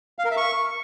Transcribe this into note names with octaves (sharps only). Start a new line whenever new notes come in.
F5
A#4
E5
C#6